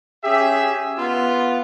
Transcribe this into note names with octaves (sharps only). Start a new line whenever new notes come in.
C#4 G4 G#4 E5
B3 F4